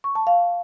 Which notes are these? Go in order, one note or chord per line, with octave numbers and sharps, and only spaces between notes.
C#6
A5
F5